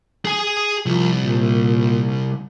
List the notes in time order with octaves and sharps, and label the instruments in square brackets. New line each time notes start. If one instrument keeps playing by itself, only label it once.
[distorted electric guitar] G#4 G#5
[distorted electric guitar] C2 [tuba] F3
[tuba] A#2